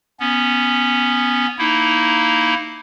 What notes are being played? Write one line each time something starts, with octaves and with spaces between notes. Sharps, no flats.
B3 C#4
A#3 D#4 E4